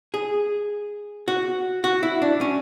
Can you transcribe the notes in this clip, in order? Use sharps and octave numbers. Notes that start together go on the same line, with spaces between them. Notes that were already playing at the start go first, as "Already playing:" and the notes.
G#4
F#4
F#4
E4
D4
C#4